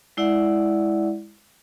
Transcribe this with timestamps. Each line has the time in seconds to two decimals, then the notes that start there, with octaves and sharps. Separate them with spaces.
0.17 G#3 E4 D5 E5 F#5